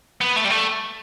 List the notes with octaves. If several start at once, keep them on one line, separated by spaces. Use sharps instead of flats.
B3
A3
G3
A3